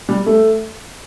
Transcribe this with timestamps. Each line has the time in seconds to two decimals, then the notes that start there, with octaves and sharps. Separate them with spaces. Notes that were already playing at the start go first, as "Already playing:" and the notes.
0.09 G3
0.26 A3